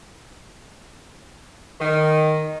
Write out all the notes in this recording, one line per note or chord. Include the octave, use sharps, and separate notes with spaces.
D#3